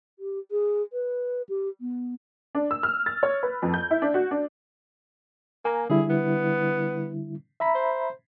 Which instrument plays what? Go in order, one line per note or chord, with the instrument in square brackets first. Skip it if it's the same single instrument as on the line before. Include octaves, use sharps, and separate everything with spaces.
[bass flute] G4
G#4
B4
G4
B3
[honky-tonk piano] D4
E6
F6
A6
C#5
B4
F2
G6
E4
D4
F#4
D4
[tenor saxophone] A#3 [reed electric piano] G#5 A#5
[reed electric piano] D3 G3 E4 [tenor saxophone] G#4
[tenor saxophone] B3
[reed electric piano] E5 A#5 B5
[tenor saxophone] C5